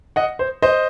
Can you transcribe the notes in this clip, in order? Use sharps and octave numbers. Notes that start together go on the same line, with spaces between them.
D#5 F#5
C5
C5 D#5